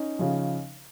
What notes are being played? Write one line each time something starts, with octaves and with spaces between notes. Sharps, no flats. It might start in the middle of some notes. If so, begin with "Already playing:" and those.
Already playing: C#4 D#4
C#3 F3